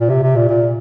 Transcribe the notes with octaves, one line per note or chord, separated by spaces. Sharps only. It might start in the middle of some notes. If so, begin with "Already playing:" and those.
A#2
C3
C3
A#2
A#2